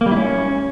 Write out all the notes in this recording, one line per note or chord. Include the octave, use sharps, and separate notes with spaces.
A#3
G3
E4
C#4